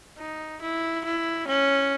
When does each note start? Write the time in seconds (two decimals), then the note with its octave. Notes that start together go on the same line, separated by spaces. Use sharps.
0.18 D#4
0.62 E4
1.05 E4
1.48 C#4